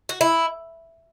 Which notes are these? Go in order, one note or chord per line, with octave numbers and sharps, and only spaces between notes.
F#4
E4